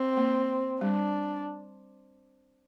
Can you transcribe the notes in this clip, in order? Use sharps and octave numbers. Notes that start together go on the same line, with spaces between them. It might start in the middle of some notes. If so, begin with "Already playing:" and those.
Already playing: C4
A#3
G3 D4